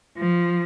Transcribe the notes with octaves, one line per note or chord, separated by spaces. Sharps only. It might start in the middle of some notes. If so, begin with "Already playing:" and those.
F3